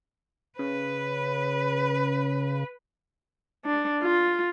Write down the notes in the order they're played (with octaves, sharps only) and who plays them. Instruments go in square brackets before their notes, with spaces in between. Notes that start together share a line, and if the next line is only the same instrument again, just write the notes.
[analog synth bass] C#3 [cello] B4
[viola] D4
F4